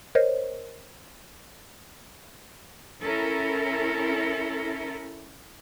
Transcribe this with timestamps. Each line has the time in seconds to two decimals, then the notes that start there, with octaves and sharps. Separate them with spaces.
0.15 A#4 C5 C#5 D#5
3.03 C#4 E4 A4 A#4